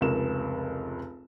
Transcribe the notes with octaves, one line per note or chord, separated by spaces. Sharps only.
F1 C#2 A#4 E7